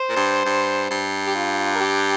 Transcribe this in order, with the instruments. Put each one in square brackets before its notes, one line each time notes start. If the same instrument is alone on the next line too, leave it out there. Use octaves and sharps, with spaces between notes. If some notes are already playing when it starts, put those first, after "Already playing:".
Already playing: [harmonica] C5
[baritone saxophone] A#2
G2
G2
G2
[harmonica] G4
F4
A#4
G4